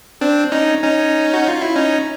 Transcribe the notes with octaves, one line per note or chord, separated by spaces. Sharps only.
C4 D4
C#4 D#4
C#4 D#4
F#4
F4
E4
C#4 D#4